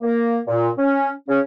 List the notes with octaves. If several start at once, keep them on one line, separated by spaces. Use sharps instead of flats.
A#3
A#2
C#4
C#3 C#4